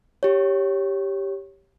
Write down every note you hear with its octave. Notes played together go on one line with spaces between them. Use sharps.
G4 C#5